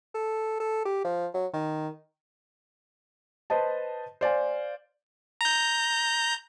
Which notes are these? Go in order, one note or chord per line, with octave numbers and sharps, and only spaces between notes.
A4
A4
G4
F3
F#3
D#3
B4 C5 D#5 A5
C5 D5 F5 G#5
A#5 G6